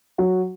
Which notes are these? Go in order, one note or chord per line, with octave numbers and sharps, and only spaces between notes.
F#3 F#4